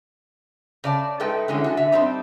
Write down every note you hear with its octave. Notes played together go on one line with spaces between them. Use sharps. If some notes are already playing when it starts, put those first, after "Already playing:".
C#3 D5 A5
G#3 A3 D#4 A4 B4 G5
D3 E3 G#3 C#4 E4
F#4 A4 G#5
D3 E5
G3 C4 D4 D#4